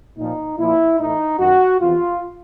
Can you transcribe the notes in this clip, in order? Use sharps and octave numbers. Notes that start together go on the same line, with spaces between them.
A#2 F3 D#4
A#2 F3 E4
A2 E3 D#4
F#2 D#3 F#4
E2 C3 E3 F4